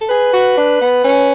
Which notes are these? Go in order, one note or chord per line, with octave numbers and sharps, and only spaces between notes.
A4
G#4 B4
F#4
D4
B3
C#4